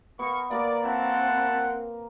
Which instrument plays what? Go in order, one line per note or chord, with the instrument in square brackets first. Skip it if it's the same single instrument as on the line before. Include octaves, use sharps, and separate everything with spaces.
[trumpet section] A#3 C#6 [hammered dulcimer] B3
[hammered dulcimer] A#3 A#4 [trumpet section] D5
[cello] C4 [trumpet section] E4 F#4 A5 [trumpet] F#5